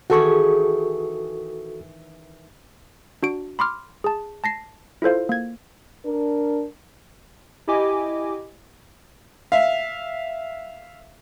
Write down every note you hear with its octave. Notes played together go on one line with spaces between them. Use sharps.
D#3 E3 F#4 G#4 A4 C#6
D4 F#4 D7
B5 C6 D6 F6
G#4 A5
A5 A#6 C7
E4 F4 A4 C5 F5
A#3 G#6
D4 A#4
E4 G4 D#5 G#5 D6
E5 F5